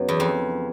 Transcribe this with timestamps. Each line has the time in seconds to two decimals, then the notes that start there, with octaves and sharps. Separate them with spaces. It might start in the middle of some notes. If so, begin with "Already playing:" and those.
Already playing: F#2 C#3 F#3 B3 D#4
0.09 E2
0.20 F2